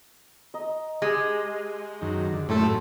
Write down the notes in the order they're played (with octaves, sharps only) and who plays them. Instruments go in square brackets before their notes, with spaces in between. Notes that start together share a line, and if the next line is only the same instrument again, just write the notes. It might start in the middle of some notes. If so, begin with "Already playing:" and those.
[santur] D#5 A#5
[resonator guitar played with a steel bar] G#3 [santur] G4 G#4
[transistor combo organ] F#2 D#3
D3
[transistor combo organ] F#2 [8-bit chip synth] A2 A3 A4 [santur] G5 C6